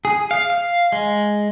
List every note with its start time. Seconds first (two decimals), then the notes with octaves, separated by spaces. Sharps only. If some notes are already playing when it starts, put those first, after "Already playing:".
0.05 G#4
0.31 F5
0.50 F5
0.92 G#3